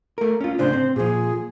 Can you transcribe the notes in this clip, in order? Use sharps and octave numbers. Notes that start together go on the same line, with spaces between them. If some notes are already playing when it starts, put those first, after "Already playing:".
A3 A#4
C#4 F4
A2 C#3 D4 C5
C4
A#2 F3 G#4